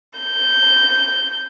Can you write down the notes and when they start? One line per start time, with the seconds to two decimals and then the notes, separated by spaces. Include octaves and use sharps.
0.20 G6